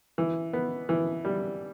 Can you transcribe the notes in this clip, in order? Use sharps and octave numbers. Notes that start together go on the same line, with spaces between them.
E3
B3
E3
G3